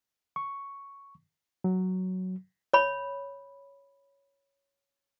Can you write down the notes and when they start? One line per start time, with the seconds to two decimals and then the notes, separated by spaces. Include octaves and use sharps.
0.36 C#6
1.64 F#3
2.74 C#5 B5